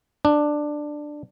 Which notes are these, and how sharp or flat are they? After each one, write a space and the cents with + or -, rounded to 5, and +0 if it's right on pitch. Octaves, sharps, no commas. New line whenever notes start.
D4 +10